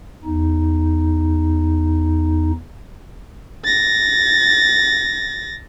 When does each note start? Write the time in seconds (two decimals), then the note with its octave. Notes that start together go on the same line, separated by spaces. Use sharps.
0.24 E2 D#4
3.64 A6 A#6